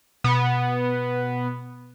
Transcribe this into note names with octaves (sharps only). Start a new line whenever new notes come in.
B2 B3